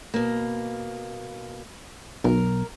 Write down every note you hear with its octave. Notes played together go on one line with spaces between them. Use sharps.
B2 A#3
B1 A#4